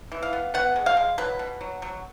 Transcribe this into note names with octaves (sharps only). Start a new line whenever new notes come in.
E3
F5
B3
B3 F#5
G#3
F5
G#3
F#3 B4
B2
F#3
F#3